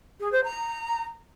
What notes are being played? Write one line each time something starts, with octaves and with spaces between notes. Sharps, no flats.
G#4
C5
A#5